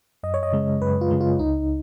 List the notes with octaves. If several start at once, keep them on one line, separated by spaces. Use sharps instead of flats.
F#2 D#5
C#5
D#5
C#3 G#3
F#2 B4
F4
C#3 G#3
F4
C#2 D#4